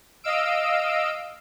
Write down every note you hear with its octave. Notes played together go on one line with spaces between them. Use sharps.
D#5 F5 E6 D7